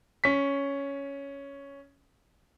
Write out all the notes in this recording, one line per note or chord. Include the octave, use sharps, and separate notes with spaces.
C#4 B6